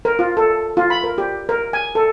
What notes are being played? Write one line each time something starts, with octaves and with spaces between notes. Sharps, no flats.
A#4
F4
A4
F4
B5
A#4
G4
A#4
G#5
A4